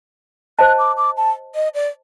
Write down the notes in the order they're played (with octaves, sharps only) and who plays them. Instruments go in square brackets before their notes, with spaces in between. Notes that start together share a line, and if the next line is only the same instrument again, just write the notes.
[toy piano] C5 D#5 A5 [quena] F#6
[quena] D6
D6
A5
D#5
D5